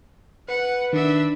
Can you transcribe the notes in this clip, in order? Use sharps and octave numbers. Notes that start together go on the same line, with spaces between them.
B4 F#5
D#3 D4 E5